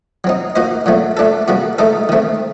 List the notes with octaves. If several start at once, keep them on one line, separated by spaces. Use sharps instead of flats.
F#3 C4 D#4
A#3 D#4 F#4 C5 D#5
A#2 F#3 A3 C4
A3 D4 A4
C3 G3 A#3 F#4
A3 D#4 A4
D#3 A3 C4